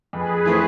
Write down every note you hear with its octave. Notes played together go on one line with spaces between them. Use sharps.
F2 G#4 B4
E3 A3 C4